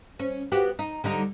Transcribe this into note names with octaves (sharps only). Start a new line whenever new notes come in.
C#4
B3 F#4 G4
D#4
D3 G3 D#4